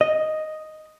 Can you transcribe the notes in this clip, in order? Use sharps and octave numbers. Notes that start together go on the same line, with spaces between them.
D#5